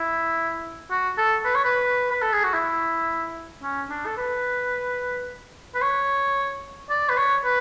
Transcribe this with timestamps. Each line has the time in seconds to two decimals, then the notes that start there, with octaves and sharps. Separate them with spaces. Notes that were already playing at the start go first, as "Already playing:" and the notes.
Already playing: E4
0.91 F#4
1.18 A4
1.45 B4
1.55 C#5
1.65 B4
2.11 B4
2.22 A4
2.33 G#4
2.44 F#4
2.54 E4
3.63 C#4
3.90 D4
4.06 A4
4.17 B4
5.75 B4
5.82 C#5
6.90 D5
7.09 B4
7.17 C#5
7.44 B4